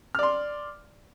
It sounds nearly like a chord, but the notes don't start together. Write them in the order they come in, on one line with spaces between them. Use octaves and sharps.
F6 D5 C6